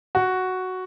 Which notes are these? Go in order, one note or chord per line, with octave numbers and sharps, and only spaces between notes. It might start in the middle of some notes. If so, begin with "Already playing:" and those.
F#4